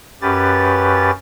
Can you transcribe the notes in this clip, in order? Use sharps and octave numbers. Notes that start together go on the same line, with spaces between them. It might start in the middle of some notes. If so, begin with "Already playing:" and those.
F#2 C#4 G4 B4 A6